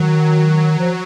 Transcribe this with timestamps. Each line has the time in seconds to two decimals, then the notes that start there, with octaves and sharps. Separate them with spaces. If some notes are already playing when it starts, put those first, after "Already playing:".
Already playing: D#3 F#3
0.78 F3